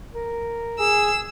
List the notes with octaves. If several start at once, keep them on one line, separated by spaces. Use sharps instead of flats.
A#4
G#4 E6